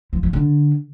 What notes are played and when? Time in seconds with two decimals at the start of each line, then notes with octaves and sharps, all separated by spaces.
0.13 F3
0.23 F3
0.33 D3